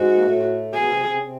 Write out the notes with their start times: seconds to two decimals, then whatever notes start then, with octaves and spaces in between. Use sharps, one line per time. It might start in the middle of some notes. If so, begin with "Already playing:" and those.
Already playing: G#2 G#3 F#4
0.15 A#3
0.23 A2 A3
0.72 B2 B3 G#4
0.85 C#4
0.89 C3 C4
1.05 C3 C4
1.16 C#4
1.22 C3 C4